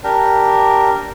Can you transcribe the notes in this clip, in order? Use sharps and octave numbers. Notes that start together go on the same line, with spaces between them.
D4 G4 A#4